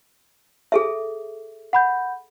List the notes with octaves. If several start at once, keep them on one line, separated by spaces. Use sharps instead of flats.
G#4 A4 E5
F#5 B5 G6